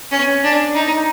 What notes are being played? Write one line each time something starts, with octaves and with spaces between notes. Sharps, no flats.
C#4
D4
D#4